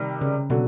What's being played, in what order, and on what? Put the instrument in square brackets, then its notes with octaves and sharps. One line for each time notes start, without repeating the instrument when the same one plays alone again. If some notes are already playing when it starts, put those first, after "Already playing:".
Already playing: [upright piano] C3 D#3 G3
[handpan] C#3
[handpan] B2 [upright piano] D3 F#3